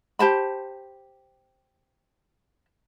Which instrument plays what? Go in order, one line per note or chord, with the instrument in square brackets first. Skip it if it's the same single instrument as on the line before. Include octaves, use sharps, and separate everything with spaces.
[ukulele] G4 C5 A5 B5